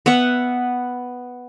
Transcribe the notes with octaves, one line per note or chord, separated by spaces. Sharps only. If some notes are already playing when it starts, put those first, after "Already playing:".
B3 E5 F#5